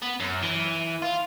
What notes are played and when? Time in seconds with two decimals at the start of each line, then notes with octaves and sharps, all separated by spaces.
0.02 B3
0.20 F#2
0.43 E3
1.02 F4